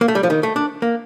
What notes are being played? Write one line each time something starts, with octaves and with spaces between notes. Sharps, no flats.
A#3
A3
G3
F3
D#3
A3
D4
A#3